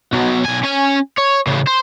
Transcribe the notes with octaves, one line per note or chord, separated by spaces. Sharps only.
B2 F#3
B1 G#5
C#4 G#5
C#5
A2 C#3
C5